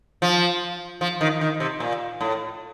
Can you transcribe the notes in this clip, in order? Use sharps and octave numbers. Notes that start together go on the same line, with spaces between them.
F3
F3
D#3
D#3
C3
A#2
A2